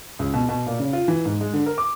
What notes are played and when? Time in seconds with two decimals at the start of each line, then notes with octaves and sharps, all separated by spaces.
0.19 C#2
0.33 B2
0.49 B2
0.66 A#2
0.79 C#3
0.93 F4
1.08 E3
1.25 G#2
1.41 G#3
1.53 D3
1.66 A#4
1.78 D6